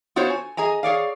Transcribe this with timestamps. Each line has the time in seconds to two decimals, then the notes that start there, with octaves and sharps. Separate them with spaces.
0.16 B3 F4 F#4 C5 C#5
0.30 G#5
0.57 G#4 D#5 G#5 A#5
0.83 G#4 C#5 D5 F5